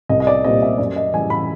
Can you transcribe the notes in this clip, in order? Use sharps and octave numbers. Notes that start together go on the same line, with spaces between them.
C2 D#5
D#5
D5
A#2 G3 C4 D#5
E5
F#2 D5
D#5
C#3 E3 G3 G#5
B5